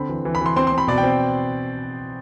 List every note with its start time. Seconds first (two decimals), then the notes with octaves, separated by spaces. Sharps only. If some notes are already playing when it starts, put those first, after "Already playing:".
Already playing: D3 C4 B5
0.09 E3
0.25 E3
0.35 B5
0.41 E3 C6
0.56 C4 C6
0.67 C6
0.72 C4
0.78 B5
0.87 B2 D5
0.98 G5
1.03 C4